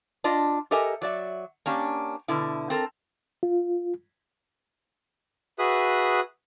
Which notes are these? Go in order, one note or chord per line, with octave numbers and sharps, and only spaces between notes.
D4 F4 D#5
G4 A4 A#4 D#5 E5 G#5
F#3 D5 E5
A#3 C#4 D4 G4
B2 D3 E4
C4 A4 A#4
F4
F#4 G#4 B4 E5 D#6 F#6